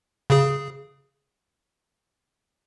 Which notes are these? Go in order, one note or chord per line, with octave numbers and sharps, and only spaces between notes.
C#3 G#4